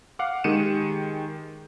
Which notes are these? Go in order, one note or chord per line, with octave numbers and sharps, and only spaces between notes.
F5 F#5 D6
D#3 G#3 G4 C#7 D#7 E7